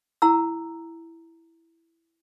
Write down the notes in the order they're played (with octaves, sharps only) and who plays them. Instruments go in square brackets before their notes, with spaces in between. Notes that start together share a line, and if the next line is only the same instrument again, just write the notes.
[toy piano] E4 F#5 A#5 E6